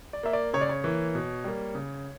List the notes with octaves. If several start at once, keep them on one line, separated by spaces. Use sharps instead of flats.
D5
A#3 E5
D5
C#3 C#5
D5
C#5
E3 A#3
B2
G3 A#3
C#3